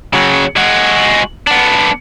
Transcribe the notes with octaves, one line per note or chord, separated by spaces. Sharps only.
C#3 F#3
G#3 F#4
B3 D4